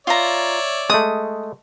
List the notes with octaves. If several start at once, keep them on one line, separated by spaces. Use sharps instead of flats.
F4 C#5 D5 E5 A#5
G#3 A3 D#6